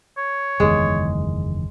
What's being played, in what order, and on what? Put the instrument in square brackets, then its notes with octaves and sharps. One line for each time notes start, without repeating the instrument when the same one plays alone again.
[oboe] C#5
[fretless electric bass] F#1 E2 D#3 [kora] G#3